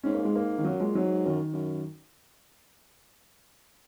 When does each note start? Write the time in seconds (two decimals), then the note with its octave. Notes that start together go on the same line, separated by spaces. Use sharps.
0.03 G#2 C#4
0.14 A#3
0.25 G#3
0.35 A#3
0.58 G#2 D#3
0.64 F#2 F#3
0.80 A#2 G#3
0.95 G#2 F#3
1.26 F#2 D#3
1.53 F#2